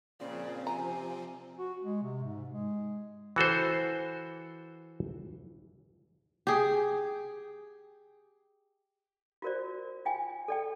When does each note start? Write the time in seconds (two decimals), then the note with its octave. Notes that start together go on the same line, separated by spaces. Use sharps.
0.20 A#2 C#3 F3 C4 D5
0.67 C3 G#5 A#5
1.58 F#4
1.84 G#3
2.03 C3
2.24 G#2
2.49 G#3
3.36 E3 F#4 A4 C5
6.47 G4 G#4
9.42 F4 F#4 A#4 C5 D5
10.05 F4 G5 G#5
10.48 A4 D5 G5